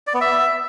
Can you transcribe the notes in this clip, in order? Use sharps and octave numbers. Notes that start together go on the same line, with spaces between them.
D5
B3
E5